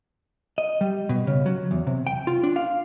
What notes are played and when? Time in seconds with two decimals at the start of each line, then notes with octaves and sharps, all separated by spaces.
0.58 D#5
0.81 G3
1.09 B2
1.27 C#3
1.46 F#3
1.71 E2
1.87 C3
2.07 G5
2.27 F4
2.43 D4
2.56 F5